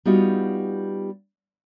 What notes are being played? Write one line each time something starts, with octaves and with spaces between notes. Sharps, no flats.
G3 B3 D#4 F4 F#4